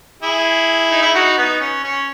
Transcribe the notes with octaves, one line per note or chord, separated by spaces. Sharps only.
E4 G#4
D#4
E4
D#4 F#4
B3 D#4
C#4
C#4